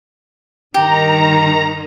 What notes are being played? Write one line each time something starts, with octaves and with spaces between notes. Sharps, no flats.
G2 D#3 G4 A#5